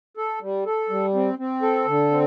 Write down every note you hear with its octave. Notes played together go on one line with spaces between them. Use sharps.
A4
G3
A4
G3
C4
C4
A4
D3
C4